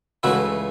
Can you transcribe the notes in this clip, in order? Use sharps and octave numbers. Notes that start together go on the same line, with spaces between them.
C#2 C#3 E3 A3 E4 F#4